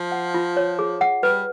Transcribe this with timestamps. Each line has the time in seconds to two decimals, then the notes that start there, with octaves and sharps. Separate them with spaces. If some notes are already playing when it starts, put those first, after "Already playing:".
Already playing: F3
0.12 F#5
0.34 F4
0.57 C#5
0.79 G#4
1.01 F#5
1.23 G3 B4